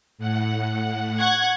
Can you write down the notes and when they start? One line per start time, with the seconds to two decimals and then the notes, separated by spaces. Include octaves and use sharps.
0.18 A2 F#5
1.20 F#5 C#6 G#6